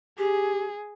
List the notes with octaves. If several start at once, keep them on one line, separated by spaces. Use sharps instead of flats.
G4 G#4